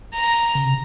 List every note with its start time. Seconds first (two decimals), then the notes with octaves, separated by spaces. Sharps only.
0.14 A#5
0.55 C#3
0.65 C3